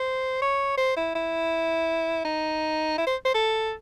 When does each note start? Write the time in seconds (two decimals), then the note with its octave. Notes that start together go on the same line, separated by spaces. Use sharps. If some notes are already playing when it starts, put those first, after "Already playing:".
Already playing: C5
0.42 C#5
0.78 C5
0.97 E4
1.15 E4
2.25 D#4
2.98 E4
3.07 C5
3.25 C5
3.34 A4